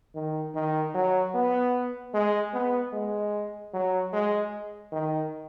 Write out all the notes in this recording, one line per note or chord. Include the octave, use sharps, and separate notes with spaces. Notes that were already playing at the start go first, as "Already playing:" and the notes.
D#3
D#3
F#3
B3
G#3
B3
G#3
F#3
G#3
D#3